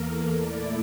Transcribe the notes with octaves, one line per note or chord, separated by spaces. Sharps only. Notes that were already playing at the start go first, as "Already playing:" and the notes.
Already playing: E2 E3 A#3 A4 A#4
A#2 A3 E4 D5